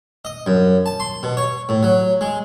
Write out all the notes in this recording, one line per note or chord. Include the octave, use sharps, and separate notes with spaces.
D#5
F#2
A5
C6
B2
C#5
A2
F#3
G#3